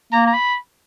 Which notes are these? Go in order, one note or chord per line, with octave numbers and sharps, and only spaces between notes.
A#3 A#5
A#5
B5